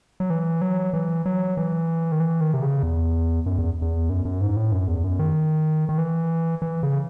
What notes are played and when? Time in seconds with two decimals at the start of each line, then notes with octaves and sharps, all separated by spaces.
0.20 F#3
0.30 E3
0.61 F#3
0.93 E3
1.26 F#3
1.57 E3
2.12 D#3
2.20 E3
2.41 D#3
2.54 C3
2.62 C#3
2.83 E2
3.46 F#2
3.58 E2
3.82 E2
4.10 F#2
4.25 F#2
4.41 G#2
4.56 A2
4.72 F#2
4.88 E2
5.04 F#2
5.19 D#3
5.89 D#3
5.98 E3
6.62 E3
6.83 C#3